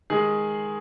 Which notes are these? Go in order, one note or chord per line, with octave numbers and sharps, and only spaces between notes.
D#3 G#3 G#4